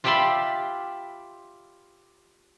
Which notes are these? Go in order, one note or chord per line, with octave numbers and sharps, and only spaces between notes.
F4 G4 D5 E5 B5 C6